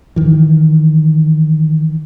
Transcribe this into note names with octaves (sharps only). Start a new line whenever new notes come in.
D#3 E3